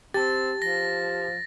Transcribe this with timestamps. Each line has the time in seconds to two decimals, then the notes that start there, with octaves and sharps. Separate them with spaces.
0.14 C4 G4 A5 A6
0.62 F3 A#6